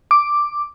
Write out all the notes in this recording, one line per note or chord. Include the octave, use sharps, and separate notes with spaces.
D6